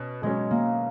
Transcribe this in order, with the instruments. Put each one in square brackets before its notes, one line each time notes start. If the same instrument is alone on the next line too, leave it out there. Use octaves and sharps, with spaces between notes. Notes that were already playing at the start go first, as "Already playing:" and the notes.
Already playing: [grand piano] B2 C#4
[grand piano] B2 F#3 C#4 [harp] G#3
[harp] A#3